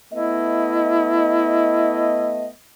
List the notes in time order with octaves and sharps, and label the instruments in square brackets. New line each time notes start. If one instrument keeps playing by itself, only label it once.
[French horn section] A3 B3 D#5 [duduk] E4